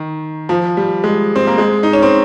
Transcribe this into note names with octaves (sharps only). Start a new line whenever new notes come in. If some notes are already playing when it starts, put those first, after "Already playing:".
Already playing: D#3
F3
G3
G#3
C4
A#3
G#3
D#4
C#4
C4